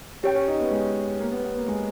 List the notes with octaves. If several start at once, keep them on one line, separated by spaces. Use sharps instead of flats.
C#4 G4 C#5 G5
C#4
D#4
B3
G#3
A#3
B3
B3
A#3
G#3